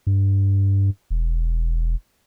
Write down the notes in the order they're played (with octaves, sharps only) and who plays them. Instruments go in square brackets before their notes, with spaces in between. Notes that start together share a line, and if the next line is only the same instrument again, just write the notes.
[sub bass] G2
E1